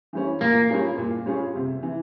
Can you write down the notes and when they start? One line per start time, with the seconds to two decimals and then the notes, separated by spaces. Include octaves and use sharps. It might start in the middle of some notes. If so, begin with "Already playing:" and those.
0.13 E3 G3 C#4
0.41 A#2 A#3
0.70 G3 C#4 F4 G#4
0.97 A#2
1.26 G3 C#4 F4 G#4
1.55 C3
1.83 E3